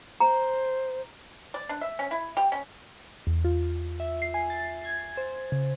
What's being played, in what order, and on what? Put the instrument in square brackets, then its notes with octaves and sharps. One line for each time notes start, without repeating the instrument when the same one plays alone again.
[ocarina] C5 [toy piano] A#5
[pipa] D5
D4
E5
C#4
E4
G4
C#4
[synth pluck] E2
F4
E5
C7
G#5
A6
G#6
C5
C#3